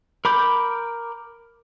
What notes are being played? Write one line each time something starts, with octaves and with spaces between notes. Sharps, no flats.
A#4 B5 D6 G6